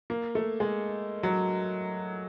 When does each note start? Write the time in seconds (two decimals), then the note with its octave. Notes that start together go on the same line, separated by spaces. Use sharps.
0.10 A#3
0.35 A3
0.60 G#3
1.23 F#3